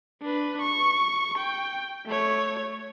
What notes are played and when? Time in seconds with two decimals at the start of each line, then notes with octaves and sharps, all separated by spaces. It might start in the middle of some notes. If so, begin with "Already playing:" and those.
0.22 D4 B4
0.61 C#6
1.38 G5
2.06 A3 C#5